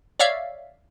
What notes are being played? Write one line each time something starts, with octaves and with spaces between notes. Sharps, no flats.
C#5 D5 E5 F5